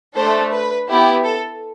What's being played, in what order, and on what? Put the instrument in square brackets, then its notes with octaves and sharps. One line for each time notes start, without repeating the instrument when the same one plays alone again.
[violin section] A3 D4 A4 C5
B4
B3 E4 G4
A4